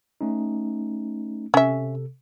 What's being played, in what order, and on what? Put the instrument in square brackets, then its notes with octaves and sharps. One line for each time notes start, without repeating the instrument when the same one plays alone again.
[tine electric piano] A3 C#4 D#4
[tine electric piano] C3 A4 [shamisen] C#4 E5